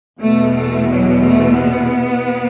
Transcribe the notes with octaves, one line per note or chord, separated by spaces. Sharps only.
E2 B2 A3
A3
F#3
A3
B3